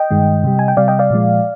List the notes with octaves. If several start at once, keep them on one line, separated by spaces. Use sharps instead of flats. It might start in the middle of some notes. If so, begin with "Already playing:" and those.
Already playing: D#5 G5
G2 D#3 G#3
C3 G3
G#5
G5
C3 G3 D5 F5
D#5 G5
D5 F5
A#2 F3 G#3